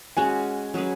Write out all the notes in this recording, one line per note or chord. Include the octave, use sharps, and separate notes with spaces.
G#3 C#4 F#4 G#5
F#3 C#4 G#4 B4